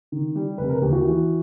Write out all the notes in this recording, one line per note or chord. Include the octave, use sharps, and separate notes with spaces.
D#3
G3
F1 B4
A#4
D#2 G4
F#4
E3